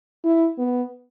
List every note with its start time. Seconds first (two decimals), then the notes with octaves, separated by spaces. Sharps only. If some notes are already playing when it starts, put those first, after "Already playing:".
0.25 E4
0.58 B3